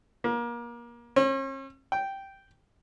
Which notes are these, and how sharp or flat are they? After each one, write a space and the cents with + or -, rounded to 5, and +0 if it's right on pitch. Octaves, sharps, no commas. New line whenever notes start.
A#3 +30
C#4 -45
G5 -5